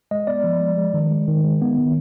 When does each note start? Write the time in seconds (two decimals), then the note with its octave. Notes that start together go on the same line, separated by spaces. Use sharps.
0.11 G#3 D#5
0.27 B3 D5
0.44 F3
0.60 G#3
0.77 G#3
0.94 D#3
1.11 G#3
1.28 D#3
1.44 G#3
1.61 B3
1.78 D#3